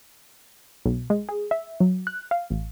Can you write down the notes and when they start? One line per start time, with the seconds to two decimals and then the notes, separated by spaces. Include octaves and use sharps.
0.86 B1
1.10 G#3
1.29 G#4
1.51 E5
1.80 F#3
2.07 F#6
2.31 F5
2.50 A1